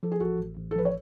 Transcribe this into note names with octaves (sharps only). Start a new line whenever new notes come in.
F3 A4
G#4
A1 F#4 A4
A1
A1
A4
F3 B4
C#5